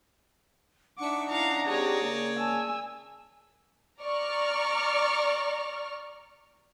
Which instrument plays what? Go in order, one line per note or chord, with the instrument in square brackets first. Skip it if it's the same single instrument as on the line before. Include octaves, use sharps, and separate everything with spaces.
[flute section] D4 D#4 F#5 [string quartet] E5 C#6 [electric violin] D6
[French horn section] C#4 E4 [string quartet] F5 C#6 [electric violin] A#5
[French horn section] G#3 C4 G4 [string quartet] G#4 C#5 D5
[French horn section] C#3 A#3
[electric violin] G#5 E6 [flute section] A5
[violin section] D5 A#5 C#6 F6